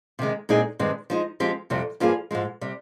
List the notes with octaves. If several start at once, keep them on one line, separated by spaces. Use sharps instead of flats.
C3 D#3 G#3
A#2 G#3 C4 D#4 G#4
G2 D#3 G#3 C4
F3 G#3 D#4
F3 G#3 C4 G4
F2 C3 G3
G2 F3 A#3 F4 G#4
G#2 F3 G#3
C3 G3